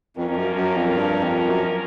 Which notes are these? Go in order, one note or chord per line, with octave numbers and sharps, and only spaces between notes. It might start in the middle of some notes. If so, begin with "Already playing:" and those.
F2 F3 A#3 C#4 F4 A#4
F2
F#2
F#2
F2
G2
F2
F#2